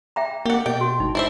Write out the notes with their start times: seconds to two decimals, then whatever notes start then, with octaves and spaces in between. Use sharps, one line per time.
0.16 E5 G5 A#5
0.46 A#3 G4 F#5
0.66 B2 D#5 G5
0.81 F#4
1.00 G#1 D#4
1.15 E4 C5 E5